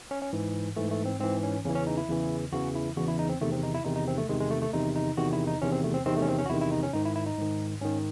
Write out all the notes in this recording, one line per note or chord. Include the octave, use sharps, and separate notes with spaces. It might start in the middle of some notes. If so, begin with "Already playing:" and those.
C#4
C#4
G#2 E3
G#2 E3 A3
A3
C4
G#2 E3 C4
C#4
E2 C#3 E3 C#4
C#4
D#4
E4
E2 C#3 E3
E2 C#3 E3 F#4
E4
E2 C#3 E3 F#4
E4
D#4
C4
E2 C3 D#3 A3
C4
D#4
E4
E2 C3 D#3 D#4
D#4
C4
A3
E2 C3 D#3 G#3
G#3
A3
A3
E2 C3 D#3 D#4
D#4
E2 C3 D#3 F#4
E4
D#4
E2 C3 D#3 C#4
C4
A3
C4
E2 C3 D#3 C4
A3
C#4
C4
C#4
F#4
E2 C3 D#3 E4
E4
D#4
C#4
G#2 D#3 D#4
E4
E4
D#4
G#2 D#3
G#2 D#3 C#4